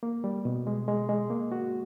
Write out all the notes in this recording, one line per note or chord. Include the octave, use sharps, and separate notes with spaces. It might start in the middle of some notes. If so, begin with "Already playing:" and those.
A#3
G3
B2
G#3
G#3
G#3
A#3
F#4